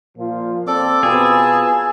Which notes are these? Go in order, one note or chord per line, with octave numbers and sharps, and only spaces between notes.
A#2 F3 F4
C4 A4 D5 D6
B2 F4 G#4 B4 A5 E6